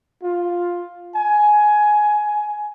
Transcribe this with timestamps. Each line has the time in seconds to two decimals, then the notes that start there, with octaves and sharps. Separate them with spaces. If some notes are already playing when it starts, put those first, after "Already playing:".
0.23 F4
1.15 G#5